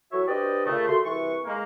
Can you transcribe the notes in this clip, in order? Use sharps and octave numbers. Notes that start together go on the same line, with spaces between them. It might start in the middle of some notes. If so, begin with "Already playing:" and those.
E3 F#3 F#4 A4 C#5 E5
D4 G4 B4 C5 D5 D#5
A#2 C#3 A3
A3 F#4 C6
C2 E3 B4 C#6
G#3 A#3